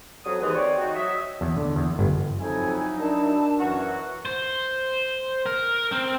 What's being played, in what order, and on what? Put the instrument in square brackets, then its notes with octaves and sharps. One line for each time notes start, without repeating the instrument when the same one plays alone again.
[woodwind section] F2 F#3 D#6
D#2 G#2 E3
C4 C#5 D5
D#4 F#4
F#3 D#5 E5
[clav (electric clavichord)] E2
D3
E2
G1
[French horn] F2 [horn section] F#3 D#4 E4 [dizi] G#5
[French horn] D4 [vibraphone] A#4 [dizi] A5
[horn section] F#2 E3 F#4 [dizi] F#5
[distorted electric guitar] C5
A#4
C4